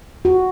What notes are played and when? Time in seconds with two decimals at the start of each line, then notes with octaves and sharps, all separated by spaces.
0.25 F#4